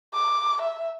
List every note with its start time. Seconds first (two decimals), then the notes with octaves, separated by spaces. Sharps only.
0.14 D6
0.62 E5